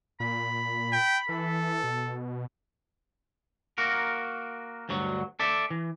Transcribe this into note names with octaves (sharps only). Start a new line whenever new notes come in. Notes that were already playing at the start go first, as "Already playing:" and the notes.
A#2 B5
G5
E3 A4
B2
A#3 F#4 A#4
D2 G2 F#3 F#4
A4 D5 E5
E3